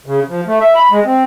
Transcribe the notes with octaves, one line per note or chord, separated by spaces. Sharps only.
C#3
F3
A3
E5
B5
G#3
C4